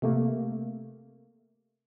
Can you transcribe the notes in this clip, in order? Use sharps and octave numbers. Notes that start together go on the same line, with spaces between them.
C3 A3 A#3